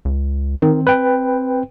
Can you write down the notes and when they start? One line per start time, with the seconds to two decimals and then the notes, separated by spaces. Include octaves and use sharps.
0.05 C#2
0.62 D#3 C4
0.87 B4 G5